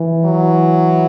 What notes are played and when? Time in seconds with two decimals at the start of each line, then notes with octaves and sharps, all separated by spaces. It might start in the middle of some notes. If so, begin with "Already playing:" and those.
Already playing: E3
0.25 F#3